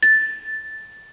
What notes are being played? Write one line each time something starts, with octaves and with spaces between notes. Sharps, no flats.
A6